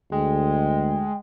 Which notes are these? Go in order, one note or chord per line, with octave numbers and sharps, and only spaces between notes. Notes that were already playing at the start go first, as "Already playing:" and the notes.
D2 G#3 G5